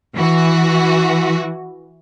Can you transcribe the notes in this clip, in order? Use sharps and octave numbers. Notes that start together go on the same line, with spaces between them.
E3 F#4